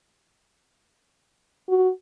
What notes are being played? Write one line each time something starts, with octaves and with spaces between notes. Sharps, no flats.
F#4